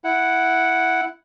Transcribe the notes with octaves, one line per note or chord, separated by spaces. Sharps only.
E4 F#5